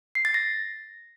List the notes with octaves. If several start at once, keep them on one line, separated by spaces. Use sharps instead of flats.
C7
A6
A#6